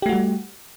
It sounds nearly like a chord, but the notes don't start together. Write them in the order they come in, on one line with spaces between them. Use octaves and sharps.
G4 A3 F#4 G3